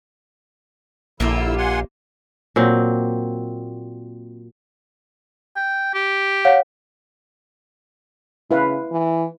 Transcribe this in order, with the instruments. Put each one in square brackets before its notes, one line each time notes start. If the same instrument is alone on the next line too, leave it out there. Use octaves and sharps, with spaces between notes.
[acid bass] A#1 [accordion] D3 E4 E6 [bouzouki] A#3 F4 G4
[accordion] F#5 G#5 C6
[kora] A#2 F#3 C4
[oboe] G5
G4
[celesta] C#5 F5 F#5
[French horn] C#3 [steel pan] E4 B4 F5
[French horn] E3